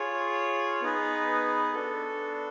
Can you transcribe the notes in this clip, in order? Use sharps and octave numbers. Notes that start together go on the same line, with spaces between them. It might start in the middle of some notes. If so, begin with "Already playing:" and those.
Already playing: F4 G#4 C#5
B3 D#4 G#4 B4
B3 D4 F#4 A4